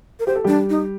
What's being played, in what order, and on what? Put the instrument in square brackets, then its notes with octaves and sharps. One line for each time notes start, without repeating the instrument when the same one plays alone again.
[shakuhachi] A#4
[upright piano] G4 [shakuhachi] C5
[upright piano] A4
[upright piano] G3 G4 [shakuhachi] D4
[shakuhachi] D#4